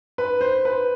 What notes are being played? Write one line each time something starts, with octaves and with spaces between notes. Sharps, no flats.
B4
C5
B4